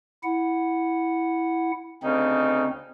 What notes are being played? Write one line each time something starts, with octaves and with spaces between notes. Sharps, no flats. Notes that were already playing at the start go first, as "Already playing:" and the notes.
E4 F#5
D2 C#3 C4 D#4